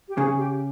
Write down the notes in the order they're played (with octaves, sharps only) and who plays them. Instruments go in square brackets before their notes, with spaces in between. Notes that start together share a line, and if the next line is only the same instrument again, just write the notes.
[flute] G4
[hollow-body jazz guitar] C#3 [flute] G#4
[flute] G4